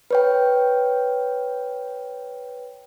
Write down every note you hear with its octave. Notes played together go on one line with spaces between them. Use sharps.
B4 C#5 G5